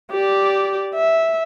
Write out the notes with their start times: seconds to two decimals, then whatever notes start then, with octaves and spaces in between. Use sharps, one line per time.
0.11 G4 D5
0.95 E5